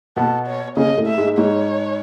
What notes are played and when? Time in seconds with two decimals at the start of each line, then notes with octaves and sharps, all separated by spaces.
0.16 B2 B3 A4
0.47 C#5
0.77 C#3 C#4 D#5
0.97 A2 A3
1.07 E5
1.18 G#2 G#3
1.37 G#2 G#3 C#5